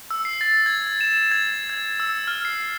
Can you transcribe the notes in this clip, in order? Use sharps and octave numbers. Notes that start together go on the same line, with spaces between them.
E6
C7
A6
G#6
E7
E7
G#6
G#6
E6
F6
C7